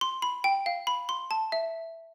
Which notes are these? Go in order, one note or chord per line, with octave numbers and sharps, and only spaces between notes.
C6
B5
G5
F5
B5
C6
A5
E5